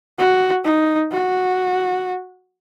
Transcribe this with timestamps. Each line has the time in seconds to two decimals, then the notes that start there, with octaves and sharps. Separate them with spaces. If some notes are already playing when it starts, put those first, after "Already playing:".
0.18 F#4
0.64 D#4
1.12 F#4